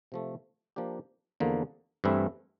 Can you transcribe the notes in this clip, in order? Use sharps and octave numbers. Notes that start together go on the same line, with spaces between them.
C3 F3 A3
F3 A#3 D4 G4
E2 D3 F3 A#3
G2 E3 A3 C4 E4